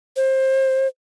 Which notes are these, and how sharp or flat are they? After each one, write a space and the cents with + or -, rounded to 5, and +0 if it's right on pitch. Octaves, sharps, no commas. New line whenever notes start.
C5 +20